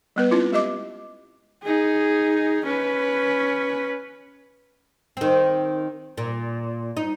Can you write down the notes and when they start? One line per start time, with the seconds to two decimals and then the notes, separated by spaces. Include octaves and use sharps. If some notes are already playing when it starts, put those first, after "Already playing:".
0.16 G3 B3 B4
0.31 C4 C#4 E4 F4
0.52 G#3 G4 D#5 D6
1.63 D#4 G#4
2.65 C#4 B4
5.17 D#3 C4
6.18 A#2
6.97 D#4